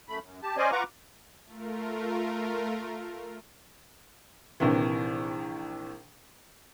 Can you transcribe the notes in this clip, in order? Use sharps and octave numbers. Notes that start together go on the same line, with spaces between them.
F#2 A3 B5
F#2
G4 A5
C#4 C5 D5 D#5 G#5
F4 B4 F#5 A#5 C#6 D6
A3 F4 A#4
A#1 C3 D#3 E3